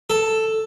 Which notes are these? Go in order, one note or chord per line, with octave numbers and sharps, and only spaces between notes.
A4